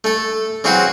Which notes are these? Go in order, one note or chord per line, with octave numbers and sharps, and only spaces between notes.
A3 A4
C#3 E3 F#3 C4 E4 F#4